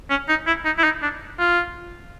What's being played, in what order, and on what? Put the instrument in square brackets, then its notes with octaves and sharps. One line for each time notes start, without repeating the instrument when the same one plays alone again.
[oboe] C#4
D#4
E4
D#4
E4
D#4
D4
F4